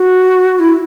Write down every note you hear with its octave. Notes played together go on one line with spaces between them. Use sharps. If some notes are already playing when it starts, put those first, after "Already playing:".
Already playing: F#4
E4